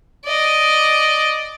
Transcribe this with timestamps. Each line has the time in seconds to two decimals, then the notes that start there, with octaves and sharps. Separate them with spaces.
0.25 D5 D#5